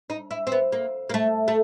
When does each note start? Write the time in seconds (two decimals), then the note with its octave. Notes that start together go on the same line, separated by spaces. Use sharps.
0.10 D#4
0.31 E4
0.47 C4
0.52 B3
0.72 A#3
1.10 A#3
1.14 A3
1.48 A3